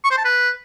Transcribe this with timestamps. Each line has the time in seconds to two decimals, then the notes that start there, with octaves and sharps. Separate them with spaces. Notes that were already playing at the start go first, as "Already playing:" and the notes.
0.04 C#6
0.11 C5
0.18 A5
0.25 B4